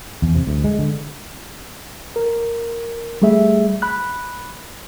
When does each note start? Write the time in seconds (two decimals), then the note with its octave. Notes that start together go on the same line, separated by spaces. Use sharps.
0.22 E2
0.35 C3
0.47 D2
0.64 G#3
0.79 D3
2.16 A#4
3.22 G3 A3 G#4 E5
3.82 B5 F#6